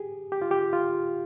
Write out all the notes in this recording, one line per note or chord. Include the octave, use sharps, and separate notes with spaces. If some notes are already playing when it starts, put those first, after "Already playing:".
Already playing: G4 G#4
G4
F4
G4
F4